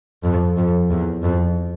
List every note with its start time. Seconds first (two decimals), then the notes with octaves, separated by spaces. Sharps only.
0.24 F2
0.57 F2
0.90 E2
1.23 F2